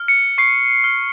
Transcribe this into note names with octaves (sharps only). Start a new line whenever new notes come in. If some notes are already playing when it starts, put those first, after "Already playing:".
Already playing: F6
C#7
C#6 C7
F6